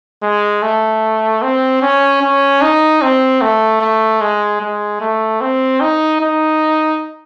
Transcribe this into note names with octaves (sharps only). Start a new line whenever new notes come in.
G#3
A3
C4
C#4
C#4
D#4
C4
A3
A3
G#3
G#3
A3
C4
D#4
D#4